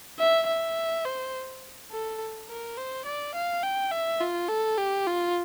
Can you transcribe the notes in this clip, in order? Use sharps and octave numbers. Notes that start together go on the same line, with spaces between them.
E5
E5
C5
A4
A#4
C5
D5
F5
G5
E5
F4
A4
G4
F4